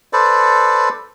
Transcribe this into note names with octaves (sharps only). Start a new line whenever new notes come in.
A4 B4 C5 D5